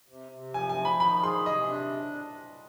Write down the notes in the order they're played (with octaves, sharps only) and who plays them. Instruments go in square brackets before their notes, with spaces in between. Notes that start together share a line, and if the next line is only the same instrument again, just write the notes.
[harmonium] C3
C3
[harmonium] F3 [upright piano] G#5
[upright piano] G#5
[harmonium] F3
[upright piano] B5
[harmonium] D#3 [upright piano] B5
[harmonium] G#4 [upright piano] C6
[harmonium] C3 [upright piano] D#5
[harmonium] D4